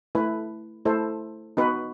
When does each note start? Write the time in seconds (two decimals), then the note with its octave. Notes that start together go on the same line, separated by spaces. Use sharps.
0.15 A3 E4 B4
0.85 A3 E4 A4 C5
1.57 B3 D#4 F#4 B4